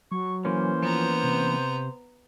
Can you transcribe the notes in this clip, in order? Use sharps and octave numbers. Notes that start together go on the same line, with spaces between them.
F#3 C#6
E3 A#3 C#4 C5
F3 B3 A#5
C3